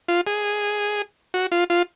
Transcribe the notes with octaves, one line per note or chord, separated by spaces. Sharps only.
F4
G#4
F#4
F4
F4